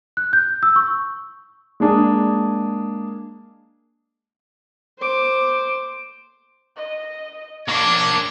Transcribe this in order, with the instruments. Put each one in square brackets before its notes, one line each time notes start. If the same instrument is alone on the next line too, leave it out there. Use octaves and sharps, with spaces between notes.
[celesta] F#6
G6
E6
C#6
[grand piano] G#3 A#3 D4 G#4
[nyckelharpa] C5 D6
[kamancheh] D#5
[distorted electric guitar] A#3 D4 [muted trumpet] C#5 [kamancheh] D6